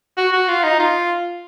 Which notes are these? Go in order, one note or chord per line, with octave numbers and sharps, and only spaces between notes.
F#4
F#4
F4
D#4
F4